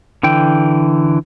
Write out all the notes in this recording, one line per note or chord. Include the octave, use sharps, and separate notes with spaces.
D3 E3 G5